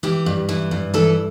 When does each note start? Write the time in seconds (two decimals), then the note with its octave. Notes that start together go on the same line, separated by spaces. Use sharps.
0.03 E3 G4
0.26 G2
0.49 E3
0.71 G2
0.94 E3 A4